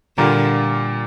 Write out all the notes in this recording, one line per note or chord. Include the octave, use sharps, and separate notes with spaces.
A#2 D3 G3 A#3 F4